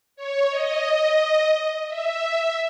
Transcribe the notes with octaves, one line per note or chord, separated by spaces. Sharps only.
C#5
D#5
E5